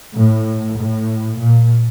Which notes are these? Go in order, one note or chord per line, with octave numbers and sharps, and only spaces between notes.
A2
A2
A#2